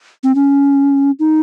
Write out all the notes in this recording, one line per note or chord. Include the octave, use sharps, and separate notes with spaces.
C4
C#4
D#4